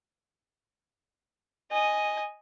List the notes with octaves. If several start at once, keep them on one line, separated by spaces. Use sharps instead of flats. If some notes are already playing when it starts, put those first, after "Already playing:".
D#5 G#5